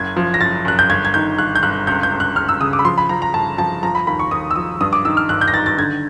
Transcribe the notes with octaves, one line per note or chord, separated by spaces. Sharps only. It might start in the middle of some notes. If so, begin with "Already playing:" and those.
Already playing: F#1 G#6
F3
A#6
F#1 A6
F#1 F#6
G6
G1 G#6
G#6
D#3 G6
G1 F#6
G6
G1 F#6
C#2 G6
G6
C#2
F#6
C#2 F6
E6
C#3 D#6
D6
B5
F3 C6
B5
F3 A#5
A#5
G1 A5
F3 A5
F3 A#5
B5
D#2 B5
C#6
D#2 D#6
E6
F3 D#6
G2 D#6
D6
D#3 E6
F6
G1 F#6
G6
A#6
D#3 A6
A6
D3 G#6